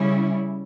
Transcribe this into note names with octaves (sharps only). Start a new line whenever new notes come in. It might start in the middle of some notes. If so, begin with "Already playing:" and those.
Already playing: C#3 G3 C#4 E4